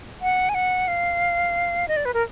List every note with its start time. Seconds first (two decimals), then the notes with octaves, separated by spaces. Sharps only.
0.22 F#5
0.49 G#5
0.54 F#5
0.88 F5
1.88 D#5
1.97 D5
2.05 B4
2.14 A#4